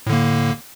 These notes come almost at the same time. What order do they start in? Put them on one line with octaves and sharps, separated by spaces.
A2 D3 A#3